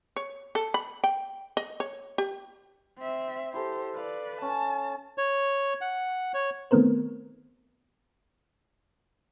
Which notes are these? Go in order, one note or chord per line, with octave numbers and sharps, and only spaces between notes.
C#5
A4
B5
G5
D#5
C#5
G4
C4 E5
E4 G4 A4 C5
B4 D5 F5
C#4 A5
C#5
F#5
C#5
D#3 A3 B3 C4 A#4 C5